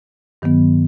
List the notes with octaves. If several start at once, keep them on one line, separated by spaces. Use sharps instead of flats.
G2 D#3 F#3 B3